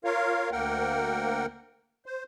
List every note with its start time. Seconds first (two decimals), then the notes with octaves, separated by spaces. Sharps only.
0.04 F4 A#4 C#5 F5
0.52 D2 A#3 A#4 F#5 G5
2.06 C5